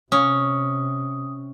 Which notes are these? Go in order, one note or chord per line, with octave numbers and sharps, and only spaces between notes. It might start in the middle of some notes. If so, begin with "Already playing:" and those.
C3 C#4 D#6